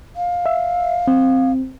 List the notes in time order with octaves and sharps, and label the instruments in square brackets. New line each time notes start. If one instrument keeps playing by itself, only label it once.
[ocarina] F5
[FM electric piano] E5
C4